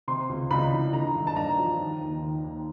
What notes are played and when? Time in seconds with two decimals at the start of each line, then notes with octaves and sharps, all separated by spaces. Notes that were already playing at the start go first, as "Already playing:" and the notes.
0.08 C3 C6
0.29 C#2
0.50 C#2 B5
0.72 E3
0.93 D3 A#5
1.15 G2
1.27 A5
1.36 G2 A#5
1.58 F3
1.80 D#3
2.01 D#2
2.23 D#3
2.44 D#2